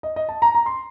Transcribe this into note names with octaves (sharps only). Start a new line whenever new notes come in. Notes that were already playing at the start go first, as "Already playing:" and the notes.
D#5
D#5
A5
A#5
A#5
C6